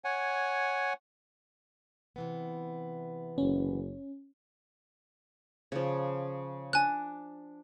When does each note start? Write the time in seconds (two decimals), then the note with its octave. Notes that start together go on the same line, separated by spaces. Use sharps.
0.05 C#5 F#5 G#5
2.16 C3 E3 B3
3.38 F#1 C#4
5.72 C#3 F3
6.73 D4 G#5 F#6